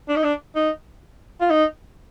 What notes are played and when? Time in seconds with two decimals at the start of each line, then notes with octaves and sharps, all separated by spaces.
0.08 D4
0.16 D#4
0.23 D4
0.55 D#4
1.40 F4
1.50 D#4